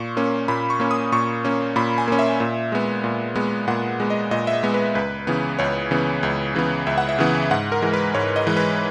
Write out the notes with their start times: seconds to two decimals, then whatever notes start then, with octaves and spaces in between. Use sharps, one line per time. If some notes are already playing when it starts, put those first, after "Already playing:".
Already playing: A#2 C#6
0.17 A#3 C#4
0.48 A#2 B5
0.70 C#6
0.80 A#3 C#4
0.91 D#6
1.12 A#2 C#6
1.45 A#3 C#4
1.76 A#2 B5
1.98 G#5
2.08 A#3 C#4
2.19 E5
2.40 A#2
2.72 G#3 B3
3.04 A#2
3.36 G#3 B3
3.67 A#2 F#5
4.00 G#3 B3
4.10 D#5
4.31 A#2 D#5
4.47 E5
4.53 D#5
4.63 G#3 B3
4.74 B4
4.95 C#2 B4
5.27 C#3 E3 B3
5.59 C#2 C#5
5.91 C#3 E3 B3
6.23 C#2
6.55 C#3 E3 B3
6.87 C#2 E5
6.98 F#5
7.09 E5
7.19 C#3 E3 B3
7.51 G#2 F#5
7.72 A#4
7.82 E3 G#3
7.93 B4
8.14 G#2 C#5
8.36 D#5
8.47 E3 G#3
8.57 B4